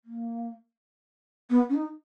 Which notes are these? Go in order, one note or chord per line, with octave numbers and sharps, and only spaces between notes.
A#3
B3
C#4
D#4